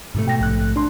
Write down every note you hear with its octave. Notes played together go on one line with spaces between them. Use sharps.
G#2 C3 A3
B2 G5 A#6
A#1 F#6
D4 C6